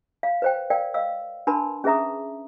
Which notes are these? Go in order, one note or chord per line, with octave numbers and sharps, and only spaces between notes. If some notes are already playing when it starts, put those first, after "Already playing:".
F5
B4 C5 G5
A#4 D5 F5 G5
D#5 F5 E6
D4 A#4 B4 A5 B5 C6
C#4 G#4 B4 E5 A#5 D#6